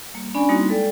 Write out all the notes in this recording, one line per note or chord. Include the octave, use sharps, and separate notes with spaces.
G3 A#3
C#4 D4 D5 G#5 B5
G3 A#3 C4 D#4 E4 F#4
G#3 A4 D5 G5